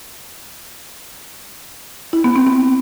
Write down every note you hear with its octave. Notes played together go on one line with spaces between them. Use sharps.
E4
B3
C4
C4